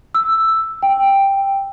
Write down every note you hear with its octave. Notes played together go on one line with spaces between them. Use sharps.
E6
G5